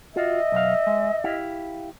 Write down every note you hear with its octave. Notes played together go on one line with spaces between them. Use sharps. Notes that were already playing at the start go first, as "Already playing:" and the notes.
F4 F#4 D#5 E5
B1 F#2 F5
G#3
E4 G4 F5